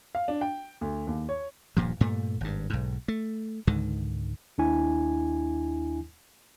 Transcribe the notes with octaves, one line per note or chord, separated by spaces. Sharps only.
F5
D4
G5
D2
D#2
C#5
D#1 G2 A#2 F3
G2 A#2 A3
G#1 G2
B1 G#2
A3
C#2 G#2 D3 D#3
D#2 D4 E4 G#5